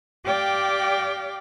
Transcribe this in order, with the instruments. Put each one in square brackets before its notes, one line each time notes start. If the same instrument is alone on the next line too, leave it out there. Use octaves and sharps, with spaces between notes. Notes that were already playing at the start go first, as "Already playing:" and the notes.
[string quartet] G4 D5 F5 G5 D6